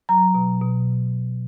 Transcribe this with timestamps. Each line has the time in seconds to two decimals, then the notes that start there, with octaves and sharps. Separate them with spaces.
0.09 F#3 A#5
0.35 B2
0.61 B2